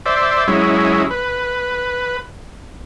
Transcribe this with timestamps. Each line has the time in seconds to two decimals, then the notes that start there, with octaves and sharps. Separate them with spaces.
0.06 C5 D5 E5
0.48 F#3 G#3 C#4 E4
1.11 B4